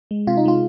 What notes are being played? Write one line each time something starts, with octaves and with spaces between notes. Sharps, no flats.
G#3
C3 F4
D#4
G#3 F4